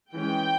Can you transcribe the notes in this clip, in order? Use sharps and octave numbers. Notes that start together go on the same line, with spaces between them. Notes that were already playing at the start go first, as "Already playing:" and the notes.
E3 G#3 C#4 G5